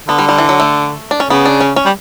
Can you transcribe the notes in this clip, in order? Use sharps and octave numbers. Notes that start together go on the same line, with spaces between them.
D3 B3
G3
G3
E3
F#3
A3
D4
C#4
C#3 B3
D4
C#4
C#4
G3